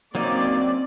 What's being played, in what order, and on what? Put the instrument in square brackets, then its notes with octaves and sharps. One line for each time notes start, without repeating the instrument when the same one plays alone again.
[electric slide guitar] F#3 A#3 D#4 [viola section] C4 C#4 D5